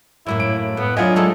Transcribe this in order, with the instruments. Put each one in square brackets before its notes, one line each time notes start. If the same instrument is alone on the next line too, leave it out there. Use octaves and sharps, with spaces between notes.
[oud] F#2 A2 A#3 [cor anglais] E4
[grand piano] D7
[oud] A2 [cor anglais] B3
[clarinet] F#3 [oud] B3 E4 [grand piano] D4 F4 D#5 [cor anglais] G#5
[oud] G#3 D#4 E4 [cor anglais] A4